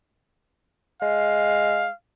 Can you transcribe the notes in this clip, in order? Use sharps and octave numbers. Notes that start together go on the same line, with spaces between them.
G#3 F5